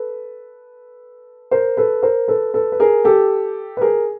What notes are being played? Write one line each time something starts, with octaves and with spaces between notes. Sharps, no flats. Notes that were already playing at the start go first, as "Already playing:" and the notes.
Already playing: A4 B4
A#4 C5
A4 B4
A#4 C5
A4 B4
A4 B4
B4
G#4 A#4
G4 A4
B4
G#4 A#4